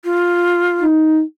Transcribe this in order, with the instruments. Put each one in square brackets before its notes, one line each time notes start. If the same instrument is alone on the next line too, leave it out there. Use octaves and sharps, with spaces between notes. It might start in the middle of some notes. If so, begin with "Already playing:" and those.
[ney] F4
[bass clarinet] D#4